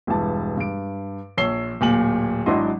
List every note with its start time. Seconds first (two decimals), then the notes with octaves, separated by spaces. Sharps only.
0.07 E1 G2 E3 A5
0.57 G2 D7
1.38 A#1 C#5 E6 C7 G7
1.81 D1 A#2 G#5 F#7
2.46 G#1 F#3 D4 E4 D#5 C6